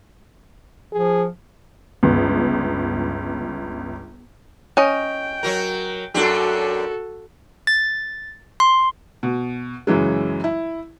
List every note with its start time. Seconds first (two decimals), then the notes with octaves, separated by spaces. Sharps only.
0.92 F3 G#4
2.03 G1 C#2
4.77 C#4 D#5 G5
5.43 F#3 F#4 A#4
6.14 F#2 D4 F#4 G4 A4
7.67 A6
8.60 C6
9.23 B2
9.87 F#2 C#3 E3 F#3 G#3
10.44 E4